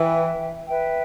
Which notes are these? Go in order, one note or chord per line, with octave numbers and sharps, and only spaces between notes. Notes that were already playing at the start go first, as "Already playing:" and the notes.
Already playing: E3 B4 E5 G5
B4 E5 G5